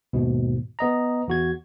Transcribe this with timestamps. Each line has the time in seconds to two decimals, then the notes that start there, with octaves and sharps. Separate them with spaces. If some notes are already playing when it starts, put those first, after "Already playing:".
0.13 D#2 G#2 B2
0.79 B3 D#5 A#5
1.28 E2 F#4 G#6